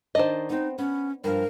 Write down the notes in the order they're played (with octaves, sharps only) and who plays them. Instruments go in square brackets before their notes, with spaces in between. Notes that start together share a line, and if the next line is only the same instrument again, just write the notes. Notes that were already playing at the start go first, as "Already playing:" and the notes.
[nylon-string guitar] D#3 D4 D5 [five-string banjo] C5 D#5
[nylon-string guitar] B3 C4 [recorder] D#4
[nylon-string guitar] B3 [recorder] C#4
[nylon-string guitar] G2 F3 [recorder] A#4